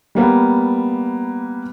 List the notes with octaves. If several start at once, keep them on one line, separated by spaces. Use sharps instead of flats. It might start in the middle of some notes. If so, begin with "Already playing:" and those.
G3 A#3 B3